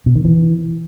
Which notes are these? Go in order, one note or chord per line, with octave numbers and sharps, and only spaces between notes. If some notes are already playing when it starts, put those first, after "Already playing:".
B2
D#3
E3